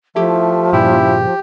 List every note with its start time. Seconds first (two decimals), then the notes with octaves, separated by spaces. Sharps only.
0.16 F3 A3 E4 G4
0.73 G2 A#2 C#3 E4 G4